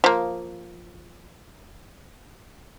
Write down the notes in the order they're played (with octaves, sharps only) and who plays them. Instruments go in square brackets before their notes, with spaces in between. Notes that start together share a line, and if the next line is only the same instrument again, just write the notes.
[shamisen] F3 A#3